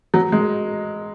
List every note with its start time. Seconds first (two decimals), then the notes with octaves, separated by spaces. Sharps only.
0.14 F#3
0.32 G#3